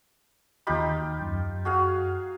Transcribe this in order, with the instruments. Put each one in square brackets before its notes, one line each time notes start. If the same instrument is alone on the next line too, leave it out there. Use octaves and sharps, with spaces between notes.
[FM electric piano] D#2 B5 [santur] D#4 F4 G4
[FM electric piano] F#2
[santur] F#4 G#4 F5